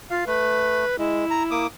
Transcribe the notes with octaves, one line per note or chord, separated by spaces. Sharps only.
F4 F5
A3 B4
G#3 E4
A#5
A#3 D6 D#6